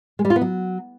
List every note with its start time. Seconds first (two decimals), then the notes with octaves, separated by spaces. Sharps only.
0.19 G#3
0.25 G3
0.30 F4
0.36 B3
0.41 F#3